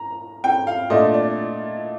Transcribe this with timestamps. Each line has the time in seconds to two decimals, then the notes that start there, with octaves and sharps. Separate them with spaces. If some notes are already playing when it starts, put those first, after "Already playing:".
Already playing: A#5
0.44 G5
0.67 F5
0.90 A#2 A3 D4 D#5
1.14 D5